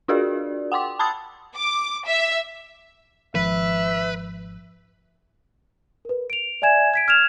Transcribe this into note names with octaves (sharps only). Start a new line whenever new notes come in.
D4 F4 F#4 G#4 A#4 D5
F#5 G5 C6 D6
A5 B5 D#6 E6 A6
D6
E5
G#1 F3 B4 E5
A#4 B4
D7 F7
D5 E5 G#5 G#6 E7
G#6 B6 D7
F6 G#6 E7 F7